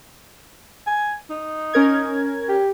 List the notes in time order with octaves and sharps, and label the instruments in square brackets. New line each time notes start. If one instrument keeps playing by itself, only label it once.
[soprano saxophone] G#5
D#4
[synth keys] C#4 A#4 G#6
[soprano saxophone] G4